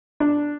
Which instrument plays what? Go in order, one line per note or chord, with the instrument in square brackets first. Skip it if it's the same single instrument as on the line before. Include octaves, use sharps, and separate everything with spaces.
[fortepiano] D4